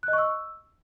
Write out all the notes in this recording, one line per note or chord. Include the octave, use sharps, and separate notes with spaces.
F#6
D#5
C#6
E6